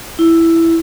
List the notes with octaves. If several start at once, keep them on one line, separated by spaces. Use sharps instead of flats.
E4